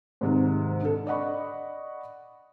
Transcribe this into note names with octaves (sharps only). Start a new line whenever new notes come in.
G#2 C3 D#3
D3 A4
D5 D#5 F#5 B5 C#6